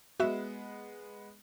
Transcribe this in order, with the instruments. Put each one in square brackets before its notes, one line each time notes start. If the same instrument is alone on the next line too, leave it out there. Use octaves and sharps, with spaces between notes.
[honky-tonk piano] G#3 B3 [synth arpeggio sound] F#4 E5